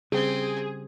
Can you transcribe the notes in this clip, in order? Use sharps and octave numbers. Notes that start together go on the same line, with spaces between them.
C#3 G3 C4 G#4